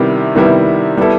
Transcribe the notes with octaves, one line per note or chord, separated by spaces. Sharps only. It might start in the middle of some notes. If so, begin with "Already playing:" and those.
Already playing: C3 D#3 G3 B3 E4
C3 D#3 G3 B3 E4
G3 B3 E4 A4